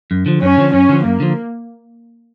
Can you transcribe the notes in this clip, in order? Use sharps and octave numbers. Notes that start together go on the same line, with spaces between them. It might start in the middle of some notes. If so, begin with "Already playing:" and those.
F#2
D3 F3
F#2 C#4
D3 F3
F#2 C#4
D3 F3
F#2 A#3
D3 F3